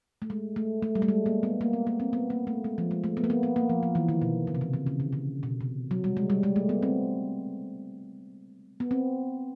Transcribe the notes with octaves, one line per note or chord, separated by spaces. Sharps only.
A3
G#3
A3
A3
G3
A3
G#3
A#3
B3
A#3
B3
A#3
C4
B3
A#3
A3
G#3
F3
G#3
A3
B3
A#3
B3
B3
A#3
F3
F3
E3
D#3
B2
C3
C#3
C3
C#3
C#3
D3
C#3
B2
C3
F#3
G3
G#3
G3
G#3
A3
B3
C4
B3
C4